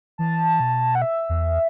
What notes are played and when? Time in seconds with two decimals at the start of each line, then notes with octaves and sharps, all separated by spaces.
0.18 E3 A5
0.60 B2
0.95 F#5
1.02 E5
1.29 E2